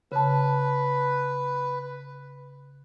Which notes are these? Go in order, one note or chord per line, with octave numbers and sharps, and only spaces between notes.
C#3 B4 A5